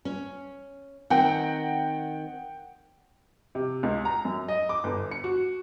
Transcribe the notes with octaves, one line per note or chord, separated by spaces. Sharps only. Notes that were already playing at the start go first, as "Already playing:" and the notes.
C#4
D#3 C4 F#5 G5
C3
C#2
A#5
F#2
D#5
D6
G1
C#7
F#4